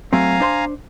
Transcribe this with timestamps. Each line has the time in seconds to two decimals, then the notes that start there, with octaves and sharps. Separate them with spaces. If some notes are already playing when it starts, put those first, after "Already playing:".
0.13 F#3 A3 C4 F5 G#5 A#5
0.40 D4 C5 C6